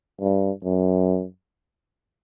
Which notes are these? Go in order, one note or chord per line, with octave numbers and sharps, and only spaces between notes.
G2
F#2